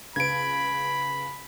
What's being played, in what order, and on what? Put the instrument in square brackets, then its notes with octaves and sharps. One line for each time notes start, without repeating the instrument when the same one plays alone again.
[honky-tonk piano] C#2 B4 [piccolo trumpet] B5 [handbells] G#6 D7